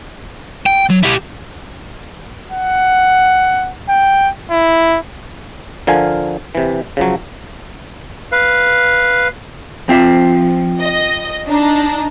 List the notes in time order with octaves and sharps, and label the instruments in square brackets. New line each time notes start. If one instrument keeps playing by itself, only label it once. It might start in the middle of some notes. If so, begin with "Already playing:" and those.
[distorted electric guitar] G5
F#3
E4 G4
[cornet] F#5
G5
E4
[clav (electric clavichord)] D3 F3 A#4 F5 G#5
C3 E3
C#3 F3 F#3
[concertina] B4 F5
[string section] F3 [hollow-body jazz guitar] C4 F4 E5
[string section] D#5
D4 D#4